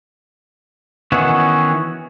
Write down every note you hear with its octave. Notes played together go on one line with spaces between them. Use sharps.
D#3 E3 B3 C#4 F#4